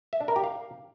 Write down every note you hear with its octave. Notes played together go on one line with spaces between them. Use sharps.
E5
D4
A#4
G4
F5